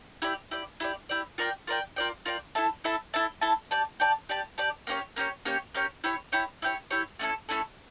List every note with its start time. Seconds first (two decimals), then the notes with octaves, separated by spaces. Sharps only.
0.22 E4 G4 D5
0.51 E4 G4 D5
0.80 E4 G4 D5
1.09 E4 G4 D5
1.38 F4 A#4 D5 G5
1.67 F4 A#4 D5 G5
1.96 F4 A#4 D5 G5
2.25 F4 A#4 D5 G5
2.55 E4 A4 E5 A5
2.84 E4 A4 E5 A5
3.14 E4 A4 E5 A5
3.41 E4 A4 E5 A5
3.71 G4 D5 A5
4.00 G4 D5 A5
4.29 G4 D5 A5
4.58 G4 D5 A5
4.87 A#3 C#4 G4 C#5
5.16 A#3 C#4 G4 C#5
5.45 A#3 C#4 G4 C#5
5.75 A#3 C#4 G4 C#5
6.04 E4 G4 C#5
6.32 E4 G4 C#5
6.62 E4 G4 C#5
6.90 E4 G4 C#5
7.19 A3 C#4 E4 A4
7.49 A3 C#4 E4 A4